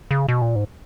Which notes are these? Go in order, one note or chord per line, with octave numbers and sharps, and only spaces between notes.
C#3
B2
A#2
G#2